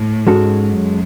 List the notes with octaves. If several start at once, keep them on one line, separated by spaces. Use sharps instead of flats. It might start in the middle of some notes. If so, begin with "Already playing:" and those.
Already playing: A2
G#2 G#3 C#4 F#4 A4
F#2